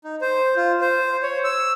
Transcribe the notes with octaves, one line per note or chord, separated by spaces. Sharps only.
D#4
C5
F4
C5
C#5
E6